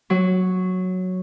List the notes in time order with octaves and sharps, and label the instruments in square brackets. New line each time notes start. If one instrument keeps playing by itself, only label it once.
[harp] F#3